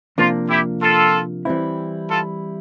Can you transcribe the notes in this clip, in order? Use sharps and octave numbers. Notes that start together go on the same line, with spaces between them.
C3 F3 A#3 D4 F4
E4 G4
F4 A4
E3 G3 C4 E4
F4 A4